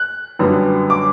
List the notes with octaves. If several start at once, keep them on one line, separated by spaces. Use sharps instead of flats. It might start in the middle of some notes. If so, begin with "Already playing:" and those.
Already playing: F#6
F#2 D3 G3 B3
D6